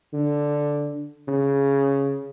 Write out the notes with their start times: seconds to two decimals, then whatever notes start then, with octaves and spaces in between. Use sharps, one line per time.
0.13 D3
1.28 C#3